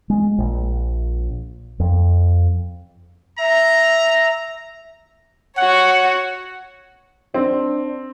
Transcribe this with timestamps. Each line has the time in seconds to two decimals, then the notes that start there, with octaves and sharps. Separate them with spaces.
0.10 G#3
0.39 A#1
1.80 F2
3.38 E5 A#5
5.58 F#4 C#5 F#5
7.34 C4 D4